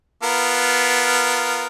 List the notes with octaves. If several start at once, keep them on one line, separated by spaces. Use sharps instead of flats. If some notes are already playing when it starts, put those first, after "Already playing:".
B3 F4 A#4